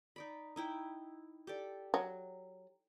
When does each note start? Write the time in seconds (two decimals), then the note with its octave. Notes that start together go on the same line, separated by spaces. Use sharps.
0.16 D#4 D5 B5
0.56 D#4 E4 G5
1.47 G4 A4 D5
1.94 F#3